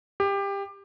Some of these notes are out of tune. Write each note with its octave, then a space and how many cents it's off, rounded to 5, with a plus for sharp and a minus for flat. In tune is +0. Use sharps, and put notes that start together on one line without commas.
G4 +20